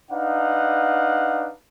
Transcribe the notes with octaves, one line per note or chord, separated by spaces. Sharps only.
D4 D#4 B4 F5 F#5